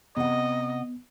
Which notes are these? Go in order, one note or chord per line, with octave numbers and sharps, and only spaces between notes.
C3 B3 D#5 F#5